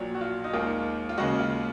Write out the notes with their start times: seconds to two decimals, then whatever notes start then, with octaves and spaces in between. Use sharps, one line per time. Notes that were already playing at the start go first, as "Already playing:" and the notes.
Already playing: A#1 A#2 F#3
0.15 F#4
0.21 F4
0.44 D#4
0.53 D#2 D#3 G#3 F4
1.09 F4
1.18 D#2 C#3 G#3 F#4
1.39 F4